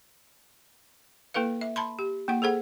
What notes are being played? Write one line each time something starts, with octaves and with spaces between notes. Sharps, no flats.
A#3 E4 A4 B4 F5
E5
A5 B5 C6
G4
A#3 E4 F#5
G#4 A4 C5 F#5